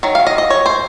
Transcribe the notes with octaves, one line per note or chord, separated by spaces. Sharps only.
D#3 F#3
F5
D#5
D#5
C#5
C5